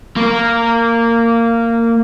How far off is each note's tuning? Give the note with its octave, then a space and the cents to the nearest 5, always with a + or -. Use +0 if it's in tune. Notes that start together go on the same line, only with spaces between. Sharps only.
A#3 -15